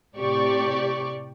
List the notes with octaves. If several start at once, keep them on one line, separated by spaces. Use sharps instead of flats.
A2 C3 G4 D5 C#6